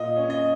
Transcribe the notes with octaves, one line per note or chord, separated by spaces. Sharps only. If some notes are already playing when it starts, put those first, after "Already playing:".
Already playing: A#2 D#5
C#4
D#5